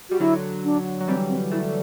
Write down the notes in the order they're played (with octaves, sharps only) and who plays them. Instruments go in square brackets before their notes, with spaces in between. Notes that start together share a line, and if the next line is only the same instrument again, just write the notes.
[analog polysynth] G3 [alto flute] F#4
[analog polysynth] D3 F#3 [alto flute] E4
[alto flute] D4
[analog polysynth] F#3
[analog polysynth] E3 G3 [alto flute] C4
[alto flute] C4
[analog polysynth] F#3 A3 [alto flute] E4